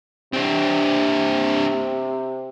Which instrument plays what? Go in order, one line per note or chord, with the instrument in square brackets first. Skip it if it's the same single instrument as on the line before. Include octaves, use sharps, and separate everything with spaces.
[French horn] C3 [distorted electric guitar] C4 D4